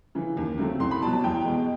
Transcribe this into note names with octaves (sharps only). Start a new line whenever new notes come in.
C#3 E3
D#2
C#3 F#3 A3 C4
C2 C6
B5
B2 F#3 A5
A5
E2 G5
B2 G#3